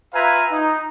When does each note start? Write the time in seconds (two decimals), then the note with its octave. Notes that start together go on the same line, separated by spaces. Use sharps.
0.14 F4 B4 E5 F5 G#5 A#5
0.52 D#4